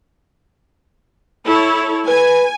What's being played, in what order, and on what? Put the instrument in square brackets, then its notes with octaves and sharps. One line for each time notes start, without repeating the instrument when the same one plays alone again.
[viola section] E4 A4 C#5
[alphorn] B4 [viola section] G#5